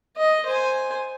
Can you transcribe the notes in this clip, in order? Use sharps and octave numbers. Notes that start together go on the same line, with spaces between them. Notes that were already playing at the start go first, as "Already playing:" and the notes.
D#5
C5 G#5